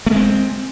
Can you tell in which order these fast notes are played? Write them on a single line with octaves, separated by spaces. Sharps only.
A3 G#3 C4